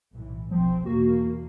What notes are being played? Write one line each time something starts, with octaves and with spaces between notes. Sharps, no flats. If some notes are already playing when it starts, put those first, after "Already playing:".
B1 A2 E3
F1 B1 F3 C4
E2 B2 A#3 F#4